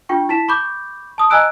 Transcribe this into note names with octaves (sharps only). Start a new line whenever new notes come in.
D4 F4 G5 C#6
E4 A5 B6 E7
B5 C#6 D6 G6
A5 D#6
D#5 G#5 A#5 E6 F#6 D7